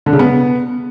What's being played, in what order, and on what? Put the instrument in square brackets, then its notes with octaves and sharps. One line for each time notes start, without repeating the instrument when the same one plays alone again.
[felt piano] D3
C#3
B3